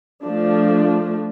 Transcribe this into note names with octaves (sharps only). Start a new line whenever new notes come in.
F3 A3 D4